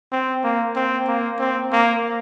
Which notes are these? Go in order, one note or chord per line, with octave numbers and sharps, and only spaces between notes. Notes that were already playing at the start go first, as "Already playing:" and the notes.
C4
A#3
C4
A#3
C4
A#3